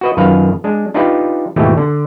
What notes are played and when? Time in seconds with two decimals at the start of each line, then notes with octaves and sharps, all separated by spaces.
0.01 F#4 B4 D#5
0.17 F#2 D#3 F4 B4 F5
0.64 G#3 D4
0.94 D4 D#4 F4 G4 B4
1.56 G#1 D#2 B2 E3 A3 G4
1.77 D3